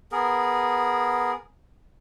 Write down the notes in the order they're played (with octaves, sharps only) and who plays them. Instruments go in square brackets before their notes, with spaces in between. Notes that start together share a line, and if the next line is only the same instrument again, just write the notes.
[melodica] B3 G#4 A#4